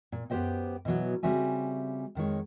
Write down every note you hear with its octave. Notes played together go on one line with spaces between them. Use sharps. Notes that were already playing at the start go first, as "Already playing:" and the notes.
A#2
F#2 B3 G4 C5 D#5 G5
B2 E3 F#3 B3
C#3 G3 C4 F#4 E5 G#5
F2 D#3 G#3 C#5